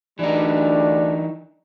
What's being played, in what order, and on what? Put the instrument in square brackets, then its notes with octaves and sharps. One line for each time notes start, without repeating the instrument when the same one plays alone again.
[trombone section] D2 G3 D4 [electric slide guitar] E3 D#4